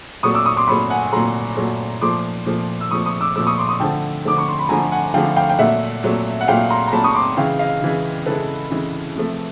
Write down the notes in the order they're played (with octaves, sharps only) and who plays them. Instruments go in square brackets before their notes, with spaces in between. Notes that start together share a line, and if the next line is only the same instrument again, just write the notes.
[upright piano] A#2 F#3 A3 C#6 D#6
D6 E6
C#6 D#6
C6 D6
A#2 F#3 A3 B5 C#6
F#5 G#5
A#2 F#3 A3 A#5 C6
A#2 F#3 A3
A#2 F3 A3 C6 D6
A#2 F3 A3
E6
A#2 F3 A3 C#6 D#6
C#6 D#6
D6 E6
A#2 F3 A3 D6 E6
C#6 D#6
C6 D6
C#6 D#6
D3 F3 A3 G5 A5
D3 F3 A3 D6
C#6
C6
B5
D3 F3 A3 G#5 A#5
F#5 G#5
D3 F3 A3 F5 G5
F5 G5
G5
A#2 F#3 A3 E5 F#5
A#2 F#3 A3
F#5
A#2 F#3 A3 F5 G5
A#5 C6
A#5
A#2 F#3 A3 A5 B5
C#6 D#6
C6 D6
C#3 E3 G#3 F5 G5
D#5 F5
C#3 E3 G#3
C#3 E3 G#3 A4 B4
C#3 E3 G#3
C3 F3 A3